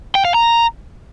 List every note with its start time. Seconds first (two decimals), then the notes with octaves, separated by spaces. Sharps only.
0.15 G5
0.25 F5
0.34 A#5